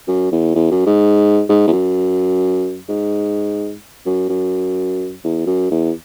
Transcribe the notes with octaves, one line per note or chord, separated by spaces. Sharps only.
F#2
E2
E2
F#2
G#2
G#2
E2
F#2
G#2
F#2
F#2
E2
F#2
E2